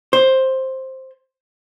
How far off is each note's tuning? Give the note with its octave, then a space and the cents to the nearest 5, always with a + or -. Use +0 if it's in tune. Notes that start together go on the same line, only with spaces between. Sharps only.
C5 +10